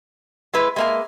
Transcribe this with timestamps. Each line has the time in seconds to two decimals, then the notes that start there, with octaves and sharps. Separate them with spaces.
0.53 G#3 E4 B4
0.76 G#3 A#3 E5 G#5